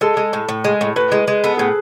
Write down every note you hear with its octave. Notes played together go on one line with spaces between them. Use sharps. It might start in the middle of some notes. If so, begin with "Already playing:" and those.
G#3 A4
G#3
A2
A2
G#3
A2
A2 B4
G#3
G#3
B3 A4
A2 G#4